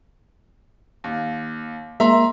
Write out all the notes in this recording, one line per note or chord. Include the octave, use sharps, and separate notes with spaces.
D#2
G#3 A#3 E5 A#5 C6